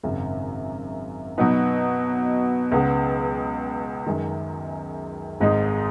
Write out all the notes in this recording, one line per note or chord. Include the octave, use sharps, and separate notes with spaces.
G#1 F#2 C#3
B2 F#3 D#4 B4
C#2 C#3 B3 G#4
F#2 D#3 G#3
G#1 G#2 G#3 D#4